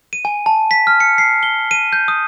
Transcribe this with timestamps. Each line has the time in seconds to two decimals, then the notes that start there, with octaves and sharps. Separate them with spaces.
0.13 D#7
0.25 G#5
0.46 A5
0.71 B6
0.87 F6
1.00 C#7
1.18 C7
1.43 G7
1.71 D#7
1.93 G6
2.08 D#6